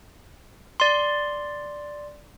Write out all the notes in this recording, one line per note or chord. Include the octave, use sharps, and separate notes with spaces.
D5 C6